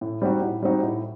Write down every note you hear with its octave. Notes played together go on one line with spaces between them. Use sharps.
A2
G3 C4 D#4 F#4
A2
G3 C4 D#4 F#4
A2